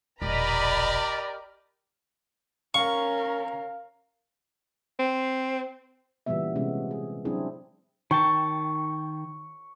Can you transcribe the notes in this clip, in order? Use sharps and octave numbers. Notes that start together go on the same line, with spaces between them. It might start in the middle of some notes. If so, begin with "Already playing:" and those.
E1 A#1 G4 A#4 D5 D#5 A#5 B5
C#4 A#4 F5 C#6
C4
A#2 C#3 E3 G3 B3 E5
C3 G#3 B3 C#4
G#4
F#3 C4 D4 E4 G#4
D#3 G5 A5 C#6